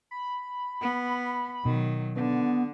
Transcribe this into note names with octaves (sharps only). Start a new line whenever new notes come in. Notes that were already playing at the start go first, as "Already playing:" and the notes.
B5
B3
B2 D#3 F#3
D3 B3